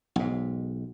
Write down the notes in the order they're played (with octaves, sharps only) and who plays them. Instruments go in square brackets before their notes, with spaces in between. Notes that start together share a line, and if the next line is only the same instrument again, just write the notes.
[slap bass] B1 G#2